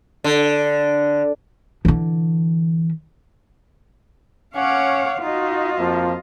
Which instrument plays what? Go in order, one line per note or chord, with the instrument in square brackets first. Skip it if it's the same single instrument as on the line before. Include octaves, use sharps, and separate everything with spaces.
[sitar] D3
[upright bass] D3 E3
[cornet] C#4 [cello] C#5 F5 [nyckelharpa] F#5 D6
[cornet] D#4 [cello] F4 D#5 [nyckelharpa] F#4
[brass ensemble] F2 F3 [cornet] A#3